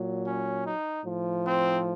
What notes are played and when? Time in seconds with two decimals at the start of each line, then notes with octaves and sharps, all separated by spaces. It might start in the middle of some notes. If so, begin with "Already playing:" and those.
Already playing: A#2 F#3
0.24 C#4
0.64 D#4
1.04 A2 F3
1.44 C4